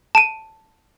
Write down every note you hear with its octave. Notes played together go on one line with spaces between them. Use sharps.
A5 D7 D#7